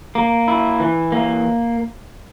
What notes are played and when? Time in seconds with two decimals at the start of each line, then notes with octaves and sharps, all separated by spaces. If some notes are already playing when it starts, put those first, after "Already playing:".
0.15 A#3
0.48 E4
0.80 E3
1.12 A#3